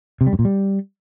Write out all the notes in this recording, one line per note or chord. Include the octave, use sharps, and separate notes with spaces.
C3
G3
F#2
A#2
G3